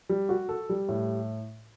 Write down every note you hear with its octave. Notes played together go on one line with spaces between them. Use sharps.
G3
F#4
A4
G3
A2